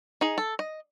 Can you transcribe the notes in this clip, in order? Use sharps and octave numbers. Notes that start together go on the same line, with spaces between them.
D#4 G#4
A4
D#5